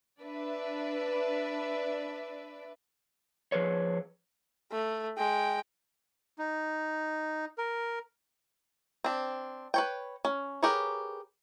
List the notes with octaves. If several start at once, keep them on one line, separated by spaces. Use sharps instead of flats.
D4 B4 D5 E5
F3 G#4 B4 C#5
A3
G#3 G5
D#4
A#4
C4 D4
B4 C#5 G5
C#4
G4 G#4 A#4 B4 C#5